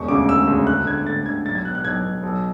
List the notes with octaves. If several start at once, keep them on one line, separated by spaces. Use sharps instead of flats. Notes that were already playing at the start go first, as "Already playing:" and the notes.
Already playing: E1 C#6
D2 C#3 D6
E1 E6
D2 C#3
D2 F#6
D3 G#6
D2 A6
D3 G#6
B1 A6
G#6
B2 F#6
F#6
B1 G#6
B2
B1